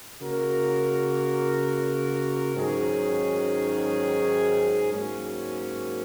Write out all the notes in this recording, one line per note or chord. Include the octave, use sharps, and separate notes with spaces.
C#3 A#3 F#4 A#4
G#2 D#3 F#3 C#4 G#4
G#2 F#3 A#3 C#4